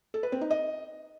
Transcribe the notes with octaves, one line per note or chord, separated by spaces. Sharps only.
A4
B4
C4
D#4
D#5